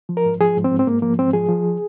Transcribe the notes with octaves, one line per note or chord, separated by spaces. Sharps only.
F3
A#4
G#2
F3 G#4
G#2
C4
G#2
C4
G#2 A#3
F3 A#3
G#2 C4
F3 G#4
F3